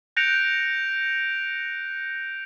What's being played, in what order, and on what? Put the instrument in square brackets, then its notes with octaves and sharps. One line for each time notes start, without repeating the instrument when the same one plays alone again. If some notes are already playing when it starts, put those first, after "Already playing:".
[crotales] F#6 G6 A#6 C#7 D7 F7